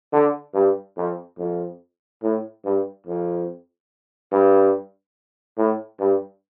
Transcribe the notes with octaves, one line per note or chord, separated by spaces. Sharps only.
D3
G2
F2
F2
A2
G2
F2
G2
A2
G2